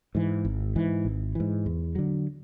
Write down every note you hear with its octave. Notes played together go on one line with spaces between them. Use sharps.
G#2 E3
G#1
G#2 E3
G#1
G#2 E3
E2
D3 F#3